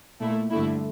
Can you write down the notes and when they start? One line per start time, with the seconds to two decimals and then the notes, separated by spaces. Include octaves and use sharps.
0.20 A#2 A3 E4
0.51 G2 D3 A3 E4